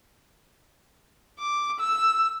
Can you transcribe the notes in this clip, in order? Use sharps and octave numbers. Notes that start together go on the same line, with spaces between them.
D6
E6